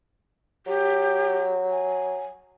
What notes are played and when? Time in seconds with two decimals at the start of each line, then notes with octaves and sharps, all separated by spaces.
0.67 F#3 G4
1.70 G#5